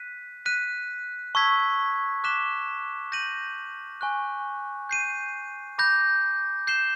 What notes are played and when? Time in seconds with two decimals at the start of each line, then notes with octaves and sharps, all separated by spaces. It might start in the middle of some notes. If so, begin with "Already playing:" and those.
Already playing: F#6 B6 D#7
0.46 F#6 B6 D#7
1.35 A5 C#6 E6 G#6 B6
2.24 D6 F#6 B6 E7 G7
3.12 G6 A#6 D#7 F#7
4.01 G#5 C#6 F#6
4.89 G6 C7 D#7
5.78 B5 D6 G6 A#6
6.67 G6 C7 E7 G7